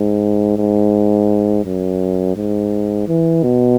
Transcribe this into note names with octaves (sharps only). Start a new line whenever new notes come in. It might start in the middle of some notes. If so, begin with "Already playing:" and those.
Already playing: G#2
G#2
F#2
G#2
E3
B2